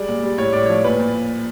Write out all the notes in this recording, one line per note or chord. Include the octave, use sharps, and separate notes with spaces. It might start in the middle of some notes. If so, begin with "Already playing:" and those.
Already playing: G3 G#3 D5
A#2
G3
A2 C#5
A2 D5
F3 C#5
A#2 B4
A#2